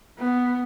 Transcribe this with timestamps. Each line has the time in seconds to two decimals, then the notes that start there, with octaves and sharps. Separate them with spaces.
0.19 B3